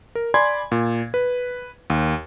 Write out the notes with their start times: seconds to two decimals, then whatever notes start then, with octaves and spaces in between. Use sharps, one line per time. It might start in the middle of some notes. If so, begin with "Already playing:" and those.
0.15 A#4
0.34 D5 G#5 B5 C6 G#6
0.72 A#2
1.14 B4
1.90 D#2